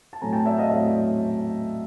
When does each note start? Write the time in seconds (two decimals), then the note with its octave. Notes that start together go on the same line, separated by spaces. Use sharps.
0.13 A5
0.21 A2 F#3 A3 C4 G#5 A#5
0.33 G5 A5
0.45 D5 E5
0.57 D#5 F5
0.70 A2 F#3 A3 C4 D#5 F5